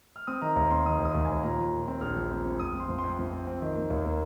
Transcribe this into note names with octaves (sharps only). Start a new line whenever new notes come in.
F6
C4 D#6
D#3 A#5
D#2 A#5
C4 C6
D#3 D#6
D#2
D#6
D#2
D#2 G#5
A#2 A#5
F3
A#2
C4
A#1 F6
F3
C4
C4
F2 D#6
C4
C6
F2
C6
F2
F2
C4
C4
D#3
A#3
D#2
A#3